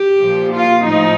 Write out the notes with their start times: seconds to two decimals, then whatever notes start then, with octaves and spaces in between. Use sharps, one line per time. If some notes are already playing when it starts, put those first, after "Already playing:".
Already playing: G4
0.19 A#2 F3
0.51 F4
0.84 A2 F3 D#4